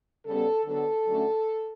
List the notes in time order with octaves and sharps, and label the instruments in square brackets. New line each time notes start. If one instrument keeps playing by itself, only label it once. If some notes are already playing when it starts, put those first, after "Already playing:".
[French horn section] C#3 G3 B3 A4
D3 F#3 B3 A4
D3 F#3 A3 C#4